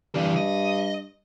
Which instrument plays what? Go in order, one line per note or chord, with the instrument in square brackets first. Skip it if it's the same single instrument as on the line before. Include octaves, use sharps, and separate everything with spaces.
[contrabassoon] G2 [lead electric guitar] E3 D5
[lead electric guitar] D#5